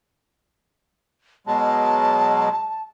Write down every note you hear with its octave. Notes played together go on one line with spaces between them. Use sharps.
B2 F#3 G#3 A5